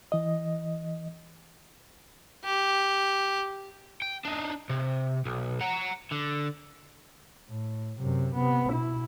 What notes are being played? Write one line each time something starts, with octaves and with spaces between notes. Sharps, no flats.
E3 D#5
G4
G5
D4 D#4
C3
B1
F#5 A#5
D3
A2
F#2 C3
C3 B3
B2 E4